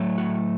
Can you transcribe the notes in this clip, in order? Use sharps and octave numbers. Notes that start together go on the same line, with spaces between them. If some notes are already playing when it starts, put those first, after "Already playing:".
Already playing: A2 F#3 A3
F#4